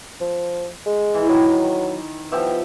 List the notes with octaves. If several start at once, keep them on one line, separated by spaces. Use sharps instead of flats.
F3
G#3
E3
D#3 F#3
F3 B3 G4 E5